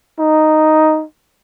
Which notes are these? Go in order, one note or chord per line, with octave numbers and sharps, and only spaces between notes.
D#4